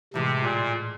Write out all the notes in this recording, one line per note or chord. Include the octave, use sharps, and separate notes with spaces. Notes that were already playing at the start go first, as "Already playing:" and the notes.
A2 C3 E3 G#3
A#2